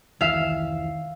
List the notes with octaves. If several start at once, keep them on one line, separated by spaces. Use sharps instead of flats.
F1 C#2 D#3 E3 E5 F5